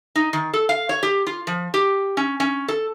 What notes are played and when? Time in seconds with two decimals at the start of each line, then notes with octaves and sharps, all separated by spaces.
0.15 D#4
0.33 D#3
0.53 A4
0.69 F5
0.89 C#5
1.03 G4
1.27 F4
1.47 F3
1.74 G4
2.17 C#4
2.40 C#4
2.68 A4